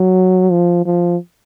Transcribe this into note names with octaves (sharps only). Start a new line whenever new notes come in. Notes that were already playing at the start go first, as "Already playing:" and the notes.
Already playing: F#3
F3
F3